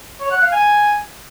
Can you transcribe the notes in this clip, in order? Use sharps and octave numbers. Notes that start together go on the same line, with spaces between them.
C#5
F#5
F5
G#5